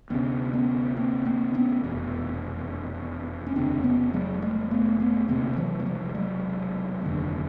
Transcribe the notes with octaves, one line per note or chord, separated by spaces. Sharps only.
D2 C3 B3 C#4
B3 C#4
A#3 C4
A#3 C4
B3 C#4
F1 E2 B2
C#4
F1 D#2 C#3 C4 D4
B3 C#4
F#3 G#3
G3 A3
A3 B3
A3 B3
E1 D2 C3 A#3 C4
E3 F#3
G#3
F3 G3
F#3 G#3
F1 D#2 D3